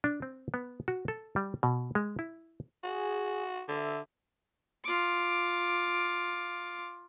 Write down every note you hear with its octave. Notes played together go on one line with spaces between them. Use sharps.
D4
C4
B3
F#4
A4
G3
B2
G#3
E4
F#4 G#4
D3 E5
F4 D6